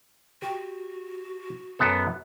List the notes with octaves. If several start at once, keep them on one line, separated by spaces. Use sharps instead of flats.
F#4 G4
F#2 B3 A4